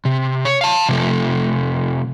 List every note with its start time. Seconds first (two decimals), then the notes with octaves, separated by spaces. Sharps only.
0.05 C3
0.45 C#5
0.61 F5 A5
0.89 C3 F3 A3